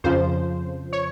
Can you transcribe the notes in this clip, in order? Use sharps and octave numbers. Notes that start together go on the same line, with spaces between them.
F2 C#3 F3 C5
C#5